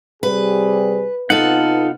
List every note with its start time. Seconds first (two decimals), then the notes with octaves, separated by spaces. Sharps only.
0.23 C3 G3 G#4 B4
1.30 C3 B3 D#4 F4 A4 F#5